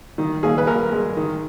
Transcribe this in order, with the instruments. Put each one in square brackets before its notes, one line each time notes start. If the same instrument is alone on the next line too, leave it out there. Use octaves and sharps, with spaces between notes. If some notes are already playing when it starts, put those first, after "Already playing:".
[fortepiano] D#3
D#2 G#4
B4
D#2 A#4
G#3
D#3